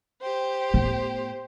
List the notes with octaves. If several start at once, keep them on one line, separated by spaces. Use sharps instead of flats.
G4 C5
A2 B3